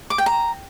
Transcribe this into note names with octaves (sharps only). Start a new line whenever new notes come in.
D6
G5
A#5